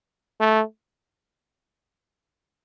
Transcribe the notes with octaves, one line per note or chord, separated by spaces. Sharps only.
A3